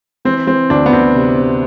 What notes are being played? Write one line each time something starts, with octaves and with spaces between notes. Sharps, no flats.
E3 C4
E3 C4
D2 D4
B3
D2 C4
C3
C3